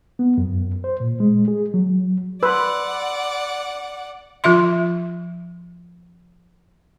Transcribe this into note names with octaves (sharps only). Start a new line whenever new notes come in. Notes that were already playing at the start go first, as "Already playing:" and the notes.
B3
F#2
C5
A#2
G#3
G#4
F#3
B4 D5 F#5 B5 C6 E6
F3 F4 E5 C6